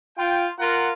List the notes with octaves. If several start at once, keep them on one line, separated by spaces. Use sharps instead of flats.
F4 G5
F4 A#4 F#5